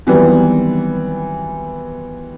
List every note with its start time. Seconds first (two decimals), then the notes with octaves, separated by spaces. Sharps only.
0.07 D#3 E3 F#3 G3 B3 C4